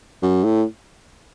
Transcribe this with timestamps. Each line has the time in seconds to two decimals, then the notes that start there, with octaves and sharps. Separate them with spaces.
0.22 F#2
0.44 A2